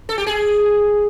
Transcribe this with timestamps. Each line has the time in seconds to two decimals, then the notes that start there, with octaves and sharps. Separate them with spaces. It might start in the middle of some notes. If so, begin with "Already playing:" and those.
0.09 A4
0.18 G4
0.27 G#4